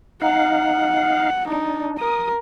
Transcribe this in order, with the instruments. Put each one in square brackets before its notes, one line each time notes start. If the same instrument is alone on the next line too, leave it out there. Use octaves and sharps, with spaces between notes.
[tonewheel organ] D#4 F5 [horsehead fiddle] F#5
[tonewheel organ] D4 [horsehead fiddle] D#4
[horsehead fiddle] A#4 [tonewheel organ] D#6